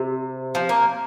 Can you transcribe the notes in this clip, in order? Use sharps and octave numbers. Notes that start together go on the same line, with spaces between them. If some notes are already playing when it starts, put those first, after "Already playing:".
Already playing: C3
F3
A#3